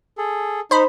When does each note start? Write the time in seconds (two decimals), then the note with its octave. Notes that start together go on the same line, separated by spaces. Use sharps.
0.18 G#4 A4
0.71 D#4 C5 B5